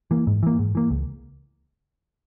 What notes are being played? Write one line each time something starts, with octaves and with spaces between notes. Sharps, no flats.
E3 A#3
G#2
E3 A#3
G#2
E3 A#3
C#2